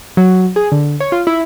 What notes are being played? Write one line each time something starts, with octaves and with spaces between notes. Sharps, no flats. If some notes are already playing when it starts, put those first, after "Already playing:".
F#3
G#4
D3
C#5
F4
E4